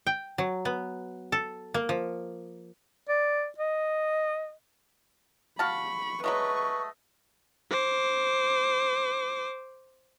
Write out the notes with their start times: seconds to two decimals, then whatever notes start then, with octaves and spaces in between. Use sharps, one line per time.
0.07 G5
0.38 F#3
0.65 B3
1.32 A4
1.74 A#3
1.89 F3
3.09 D5
3.58 D#5
5.59 F#4 F5 A5 B5 C#6
6.24 F#3 G#3 A3 B4 D#5 C#6
7.70 C5 D6